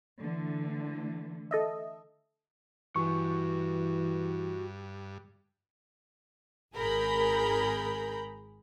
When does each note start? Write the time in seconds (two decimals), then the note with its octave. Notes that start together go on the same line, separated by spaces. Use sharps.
0.22 D3 E3 A3
1.51 A4 D#5 E5
2.96 G2 E3 F#4 G#5 C#6
6.75 G#1 G#4 A#4 A#5 B5 G6